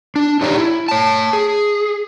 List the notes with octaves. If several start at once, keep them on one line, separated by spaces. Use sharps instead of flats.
D4
D#4 G4 C#5 D5 A#5
E4
C#5 A5
G#4